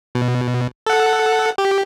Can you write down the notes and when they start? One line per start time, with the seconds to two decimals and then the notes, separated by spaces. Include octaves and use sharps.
0.15 B2
0.87 A4 F#5
1.58 G4